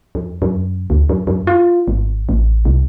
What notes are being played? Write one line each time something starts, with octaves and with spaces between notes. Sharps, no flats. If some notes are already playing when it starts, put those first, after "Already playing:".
F2
F#2
D2
F#2
F#2
F4
G#1
A1
C2